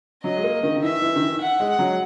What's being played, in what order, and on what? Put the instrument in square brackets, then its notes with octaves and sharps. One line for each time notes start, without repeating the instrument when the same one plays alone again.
[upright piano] F#3 [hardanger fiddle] D#5
[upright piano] G#3
A#3
D#3
D#3
[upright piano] E3 [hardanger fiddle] E5
[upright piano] E3
D#3
E3
[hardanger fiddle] F#5
[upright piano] G#3
[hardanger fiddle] F#5
[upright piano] F#3